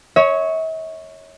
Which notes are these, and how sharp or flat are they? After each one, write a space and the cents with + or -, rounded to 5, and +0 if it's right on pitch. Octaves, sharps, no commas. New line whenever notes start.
C#5 +0 E5 -45